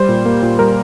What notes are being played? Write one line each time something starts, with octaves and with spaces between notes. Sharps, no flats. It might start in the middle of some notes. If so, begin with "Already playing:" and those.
Already playing: G3 C5
A#2
A#3
A#2
G3 A#4